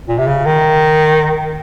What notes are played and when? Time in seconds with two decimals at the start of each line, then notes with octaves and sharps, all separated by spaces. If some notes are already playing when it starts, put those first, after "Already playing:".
0.08 A#2
0.18 C3
0.27 C#3
0.45 D#3